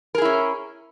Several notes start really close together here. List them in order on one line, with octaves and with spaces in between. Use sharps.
A#4 G#4 E4 C#4